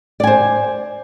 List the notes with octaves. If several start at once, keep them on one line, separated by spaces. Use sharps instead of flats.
C5 D5 G#5